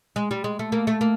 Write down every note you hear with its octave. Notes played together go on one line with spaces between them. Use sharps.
G#3
G3
G#3
A3
A#3
A3
A#3